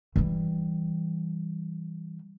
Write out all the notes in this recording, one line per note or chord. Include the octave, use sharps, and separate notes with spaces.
E3 G3